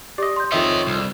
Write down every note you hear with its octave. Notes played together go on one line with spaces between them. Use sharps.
G4 D5 D#5
C6 G6
F2 D#3 C#5 D#5 E5
C2